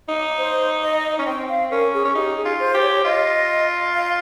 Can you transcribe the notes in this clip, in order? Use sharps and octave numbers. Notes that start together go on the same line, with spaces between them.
D#4
C5
D#5
C#4
C4 G5
F5
C#4 A#4
G#4
C#4
D#4 G4
G#4
F4
C5
G4
C#5
F4 D#5
F5